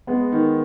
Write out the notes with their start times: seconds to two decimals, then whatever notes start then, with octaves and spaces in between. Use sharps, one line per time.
0.07 G#3 B3
0.32 D#3